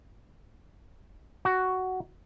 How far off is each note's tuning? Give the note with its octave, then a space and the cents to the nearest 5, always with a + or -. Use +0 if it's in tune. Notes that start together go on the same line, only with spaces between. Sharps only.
F#4 +5